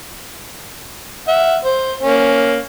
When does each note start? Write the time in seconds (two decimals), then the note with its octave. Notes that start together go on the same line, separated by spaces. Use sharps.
1.28 E5 F#5
1.64 C5
2.02 A#3 C#4